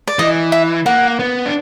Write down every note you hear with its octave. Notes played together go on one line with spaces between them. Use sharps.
D5
E3 D#5
E5
A#3 F#5
B3
D4